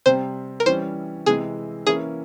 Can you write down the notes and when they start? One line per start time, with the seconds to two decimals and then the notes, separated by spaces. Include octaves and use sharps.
0.06 C3 G3 C4 C5
0.60 A#4
0.66 E3 G3 C#4 C5
1.26 C3 E3 G#3 G#4
1.86 E3 A#3 C#4 E4 G#4